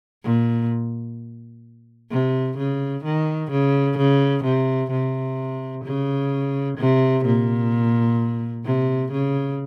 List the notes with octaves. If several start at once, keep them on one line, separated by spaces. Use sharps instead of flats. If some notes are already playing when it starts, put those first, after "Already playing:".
A#2
C3
C#3
D#3
C#3
C#3
C3
C3
C#3
C3
A#2
C3
C#3